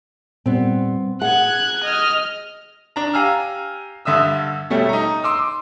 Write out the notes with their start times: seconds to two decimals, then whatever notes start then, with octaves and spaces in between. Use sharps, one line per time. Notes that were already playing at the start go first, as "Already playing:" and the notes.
0.46 A#2 G3 B3 C4
1.22 G#4 F#5 F#6 G#6
1.84 D#5 F6
2.96 D4 A#5
3.13 G4 F5 G#5 A#5 E6 F6
4.05 G2 D3 E5 D#6 E6
4.70 B2 G3 A3 C#4 G4 A4
4.89 D#4 A#5
5.24 C6 D6 E6